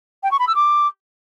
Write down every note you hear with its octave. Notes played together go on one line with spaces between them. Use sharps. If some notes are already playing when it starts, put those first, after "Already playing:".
G5
C#6
B5
E6
D6